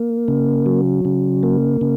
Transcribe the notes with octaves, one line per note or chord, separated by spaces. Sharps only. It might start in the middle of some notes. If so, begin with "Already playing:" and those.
Already playing: A#3
C#3
F#3
C#3
A#3
C#3